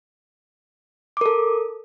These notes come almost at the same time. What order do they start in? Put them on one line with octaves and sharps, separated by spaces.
D6 A#4 A4